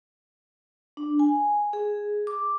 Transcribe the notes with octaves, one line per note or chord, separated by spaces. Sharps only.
D4
G#5
G#4
D6